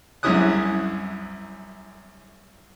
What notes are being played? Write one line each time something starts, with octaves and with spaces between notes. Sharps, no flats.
C2 F#2 C#4 E4 D#6 F#6